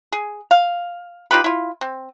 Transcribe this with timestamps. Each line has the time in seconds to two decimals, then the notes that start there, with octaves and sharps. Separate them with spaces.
0.12 G#4
0.51 F5
1.31 D#4 F4 G4 B4
1.44 E4 F4
1.81 C4